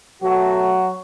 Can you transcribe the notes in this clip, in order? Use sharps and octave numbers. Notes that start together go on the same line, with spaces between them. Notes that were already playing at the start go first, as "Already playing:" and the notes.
B2 F#3 A3 F#4